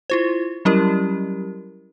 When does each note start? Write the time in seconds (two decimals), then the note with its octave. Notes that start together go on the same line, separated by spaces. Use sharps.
0.10 E4 F4 C5
0.65 F#3 G3 C#4 E4 G4 A#4